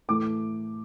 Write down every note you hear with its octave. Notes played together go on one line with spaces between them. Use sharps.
A2 E3 A3 D6